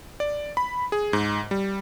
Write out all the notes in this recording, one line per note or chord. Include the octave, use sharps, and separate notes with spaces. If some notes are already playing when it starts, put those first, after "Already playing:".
D5
B5
G#4
G#2
G3